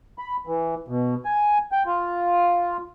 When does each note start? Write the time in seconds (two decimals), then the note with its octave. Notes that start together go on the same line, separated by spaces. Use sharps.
0.18 B5
0.47 E3
0.88 B2
1.25 G#5
1.72 G5
1.86 F4